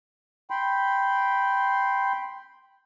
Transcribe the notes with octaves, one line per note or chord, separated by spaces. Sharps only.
G5 B5 C6